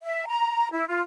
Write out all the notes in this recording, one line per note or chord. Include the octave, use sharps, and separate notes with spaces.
E5
A#5
E4
F4